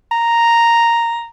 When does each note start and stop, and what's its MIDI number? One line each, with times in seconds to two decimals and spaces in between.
0.12 1.28 82